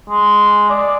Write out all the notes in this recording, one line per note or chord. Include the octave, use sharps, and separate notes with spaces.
G#3
D5